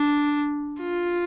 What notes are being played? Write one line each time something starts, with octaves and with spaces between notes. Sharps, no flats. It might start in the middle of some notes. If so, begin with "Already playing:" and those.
Already playing: D4
F4